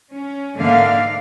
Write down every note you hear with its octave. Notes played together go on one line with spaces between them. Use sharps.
C#4
G#2 D3 A3 A#3 D4 F5